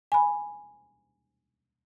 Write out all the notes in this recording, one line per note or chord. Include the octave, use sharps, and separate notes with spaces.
G#5 B5